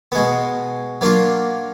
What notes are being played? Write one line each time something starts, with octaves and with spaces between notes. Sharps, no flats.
B2 G#3 B3
F#3 A#3 D4 F4